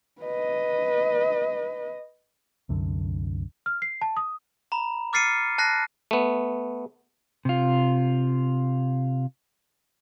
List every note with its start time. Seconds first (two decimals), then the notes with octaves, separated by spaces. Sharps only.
0.21 B4 D#5
2.69 C2 F#2 D3
3.66 F6
3.82 C7
4.01 A5
4.17 D#6
4.72 A#5 B5
5.13 D6 F6 A6 C7 C#7 D#7
5.58 A5 F#6 A#6 C7
6.11 A3 B3
7.45 C3 F4